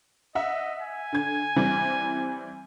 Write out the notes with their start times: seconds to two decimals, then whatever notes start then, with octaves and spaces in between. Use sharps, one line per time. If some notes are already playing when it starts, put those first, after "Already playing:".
0.35 D#5 E5 F#5
0.81 G#5
1.13 D3 G#6
1.56 E3 G3 C4